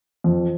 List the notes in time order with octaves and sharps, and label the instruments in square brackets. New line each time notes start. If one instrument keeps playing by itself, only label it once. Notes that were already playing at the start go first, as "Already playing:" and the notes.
[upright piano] F2